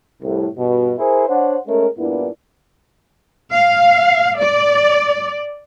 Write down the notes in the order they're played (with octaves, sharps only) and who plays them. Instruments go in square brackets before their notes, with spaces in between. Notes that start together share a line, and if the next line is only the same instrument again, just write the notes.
[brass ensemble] C2 A2
G2 B2
E4 G#4 A#4 C5
D4 C5 C#5 F#5
G#3 A3 C#4 G#4 A#4
G2 A#2 B3 D4 E4
[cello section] F5
D5